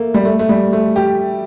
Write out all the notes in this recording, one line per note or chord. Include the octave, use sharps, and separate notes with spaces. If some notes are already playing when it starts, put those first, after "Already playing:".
Already playing: A3 A#3
G3
A3
A3
G3
A3
G4